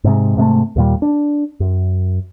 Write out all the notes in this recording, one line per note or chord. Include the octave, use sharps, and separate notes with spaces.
G#2 C3 G#3
G#2 C3 G#3 A3
D#2 A#2 G3
D4
F#2